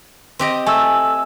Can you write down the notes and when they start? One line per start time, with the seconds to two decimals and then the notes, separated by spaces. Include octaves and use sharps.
0.39 C4 G4 D#5
0.66 A3 G#5 E6